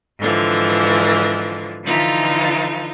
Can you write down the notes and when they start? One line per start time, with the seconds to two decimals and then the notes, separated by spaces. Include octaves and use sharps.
0.18 G#2 D3 E3 F3
1.83 D3 E3 F3 D#4 F4 A4